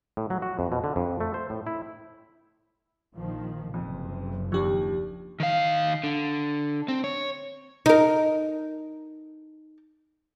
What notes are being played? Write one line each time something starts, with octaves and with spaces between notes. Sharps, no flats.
A2
F#3
F#4
F2
B2
D3
F2
A3
C5
A2
E4
A#1 D#3 F3
F#1 F2 C3
D#2 F3 D4 G4 C#6
D#3 F5
D3
C4
C#5
D#4 A#4